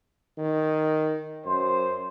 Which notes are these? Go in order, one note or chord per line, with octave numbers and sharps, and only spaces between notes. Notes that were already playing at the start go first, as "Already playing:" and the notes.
D#3
F#2 C5